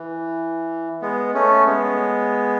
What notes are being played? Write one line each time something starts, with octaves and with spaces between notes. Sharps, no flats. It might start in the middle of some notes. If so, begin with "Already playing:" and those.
Already playing: E3
G#3 B3
A3 C#4
G#3 B3